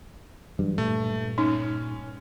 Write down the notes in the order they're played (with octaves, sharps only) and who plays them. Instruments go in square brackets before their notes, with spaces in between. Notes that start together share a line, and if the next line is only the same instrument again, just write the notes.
[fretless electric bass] G2 [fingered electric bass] E3 F#3
[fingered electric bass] A#2 [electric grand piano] A3
[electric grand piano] C#4 [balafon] D#4